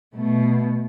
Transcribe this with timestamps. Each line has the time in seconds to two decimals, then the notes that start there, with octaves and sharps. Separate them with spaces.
0.14 B2 A3